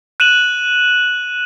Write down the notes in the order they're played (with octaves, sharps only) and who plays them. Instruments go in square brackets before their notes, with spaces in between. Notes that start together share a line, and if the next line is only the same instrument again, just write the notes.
[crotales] F#6 D#7 E7 F#7